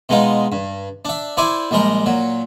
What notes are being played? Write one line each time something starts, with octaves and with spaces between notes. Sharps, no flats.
B2 G#3 D#4 F4
G2
D4 E5
E4 C5 D5 E5 G#5
A#1 G3 G#3 A#4
A#2 F#3